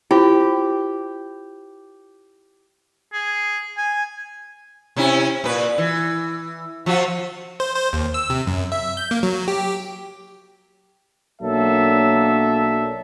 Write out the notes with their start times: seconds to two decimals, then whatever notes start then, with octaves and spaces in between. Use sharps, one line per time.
0.11 E4 F4 G4 C5
3.13 G#4
3.77 G#5
4.96 C3 C#4 E4
5.44 A#2 B4
5.78 E3
6.86 F3 F4 F#4
7.60 C5
7.75 C5
7.93 D#2
8.14 E6
8.30 C3
8.47 F#2
8.72 E5
8.97 G6
9.11 A#3
9.23 F#3
9.48 G4
11.42 B1 F#3 A#3 D4 A4 E5